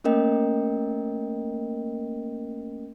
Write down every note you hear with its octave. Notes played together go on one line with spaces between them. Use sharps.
A3 A#3 C#4 A#4 D#5 G5